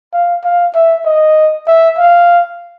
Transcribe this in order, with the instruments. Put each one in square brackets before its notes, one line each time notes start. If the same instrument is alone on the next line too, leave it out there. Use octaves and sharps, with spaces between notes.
[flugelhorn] F5
F5
E5
D#5
E5
F5